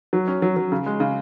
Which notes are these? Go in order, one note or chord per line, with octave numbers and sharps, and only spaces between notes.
F#3
C#4
F#3
F#3
C#3
G#3
C#3